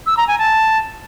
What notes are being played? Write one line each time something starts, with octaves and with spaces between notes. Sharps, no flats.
E6
A#5
G#5
A5